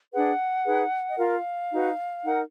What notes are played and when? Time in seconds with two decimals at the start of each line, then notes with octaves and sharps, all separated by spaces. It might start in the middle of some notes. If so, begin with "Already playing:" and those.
0.12 D4 G#4 B4 F#5
0.65 D#4 G#4 B4
1.10 D#5
1.18 F4 A#4 F5
1.71 D#4 F#4 B4
2.24 D#4 A#4 F#5